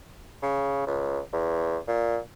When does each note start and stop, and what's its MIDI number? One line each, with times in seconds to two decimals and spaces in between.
0.42 0.83 49
0.87 1.20 37
1.33 1.78 40
1.87 2.18 46